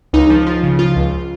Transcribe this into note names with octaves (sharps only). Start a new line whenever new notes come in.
C#2 D#4
F3
F3 F4
C#3
F3 F4
C#2